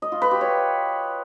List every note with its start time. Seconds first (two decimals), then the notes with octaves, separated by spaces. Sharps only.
0.02 D#5
0.12 F4
0.22 B4
0.31 G4
0.41 C#5